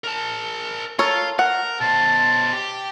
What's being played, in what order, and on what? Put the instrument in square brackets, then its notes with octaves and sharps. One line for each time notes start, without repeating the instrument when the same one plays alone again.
[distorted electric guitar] A#4 A5
[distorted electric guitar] F4 [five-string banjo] A4 A#4 C#5
[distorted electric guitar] A#4 [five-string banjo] F#5
[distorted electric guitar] B2 C5 [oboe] A5
[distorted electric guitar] G4